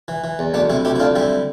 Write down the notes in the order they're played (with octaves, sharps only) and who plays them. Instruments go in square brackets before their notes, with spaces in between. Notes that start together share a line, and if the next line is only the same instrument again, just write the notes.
[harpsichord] E3
E3
E2
D2 B3 D4
C3 C4 E4
D2 E4 G4
E4
D2 D4 F4
G3 C4 E4